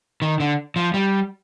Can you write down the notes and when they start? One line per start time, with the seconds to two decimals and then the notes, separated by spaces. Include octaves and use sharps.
0.22 D#3
0.40 D3
0.76 F3
0.94 G3